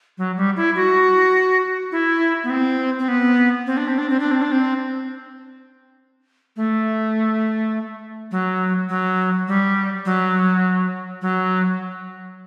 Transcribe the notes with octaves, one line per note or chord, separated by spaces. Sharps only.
F#3
G3
E4
F#4
E4
B3
C4
C4
B3
C4
D4
C4
D4
C4
D4
C4
D4
C4
A3
F#3
F#3
G3
F#3
F#3